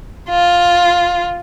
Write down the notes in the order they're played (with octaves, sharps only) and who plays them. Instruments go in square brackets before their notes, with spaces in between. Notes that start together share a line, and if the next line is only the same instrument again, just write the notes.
[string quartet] F4